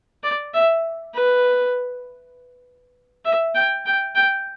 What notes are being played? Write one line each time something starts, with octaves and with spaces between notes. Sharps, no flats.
D5
E5
B4
E5
G5
G5
G5